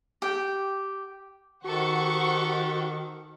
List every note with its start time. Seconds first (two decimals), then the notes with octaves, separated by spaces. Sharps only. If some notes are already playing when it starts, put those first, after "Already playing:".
0.22 G4 G5
1.64 D#3 F#4 G4 A4 C5 F#5 C#6